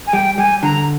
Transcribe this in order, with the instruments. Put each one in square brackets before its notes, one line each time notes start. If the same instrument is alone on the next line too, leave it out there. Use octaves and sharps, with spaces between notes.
[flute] G#5
[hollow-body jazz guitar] G3 [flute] G5
[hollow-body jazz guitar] G3 [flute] G#5
[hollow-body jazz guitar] D3 [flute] A#5